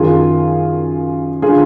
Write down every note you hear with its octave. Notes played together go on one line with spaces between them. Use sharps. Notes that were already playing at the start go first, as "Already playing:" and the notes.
Already playing: F#2 D#3 F4 G#4
D3 F4 G#4